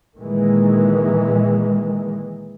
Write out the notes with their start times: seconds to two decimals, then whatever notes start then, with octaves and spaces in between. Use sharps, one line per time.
0.17 A#2 D#3 E3 G#3